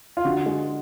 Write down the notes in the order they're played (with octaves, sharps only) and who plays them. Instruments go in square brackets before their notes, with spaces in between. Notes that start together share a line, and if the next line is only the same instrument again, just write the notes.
[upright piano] F4
D3 F#4
G#3